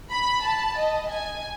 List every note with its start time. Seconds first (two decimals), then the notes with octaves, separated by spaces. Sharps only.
0.12 B5
0.45 A5
0.78 D#5
1.11 G#5